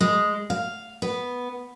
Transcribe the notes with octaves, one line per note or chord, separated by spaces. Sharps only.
G#3
F5
B3